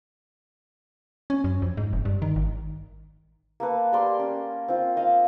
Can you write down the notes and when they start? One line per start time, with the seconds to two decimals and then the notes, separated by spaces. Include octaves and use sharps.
1.30 C#4
1.44 F#2
1.62 F2
1.77 G#2
1.93 F1
2.05 G2
2.22 D#3
2.36 G#1
3.60 A#3 A4 B4
3.93 G3 A#4 D5 C6
4.19 C#4
4.68 C4 F4
4.97 D#5 F5